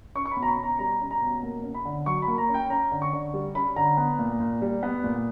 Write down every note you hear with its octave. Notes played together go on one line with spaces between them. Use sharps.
C#4 C#6
C#6
B5
B2
A#5
B5
B2
A#5
G3 A#5
C#4
A#5
B2
A#3
C#4
B5
D3
F#3 C#6
B5
A#3
A#5
C#4
G5
C#4 A#5
D3
C#6
D3
G3
C#4 B5
D3 A#5
B3
A#2
A#2
G3
B3
A#2